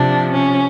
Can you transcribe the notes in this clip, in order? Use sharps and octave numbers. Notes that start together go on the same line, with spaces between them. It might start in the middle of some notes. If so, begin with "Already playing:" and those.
Already playing: C3 F3 D4
C#4